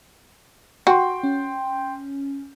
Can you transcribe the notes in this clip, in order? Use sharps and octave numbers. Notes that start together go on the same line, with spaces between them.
F#4 G5 C6
C#4